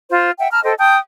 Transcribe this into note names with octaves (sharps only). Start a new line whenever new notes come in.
F4 C5
E5 F#5 G5
A5 A#5 F6
A4 C5 D#5 G5
G5 A5 D#6 G6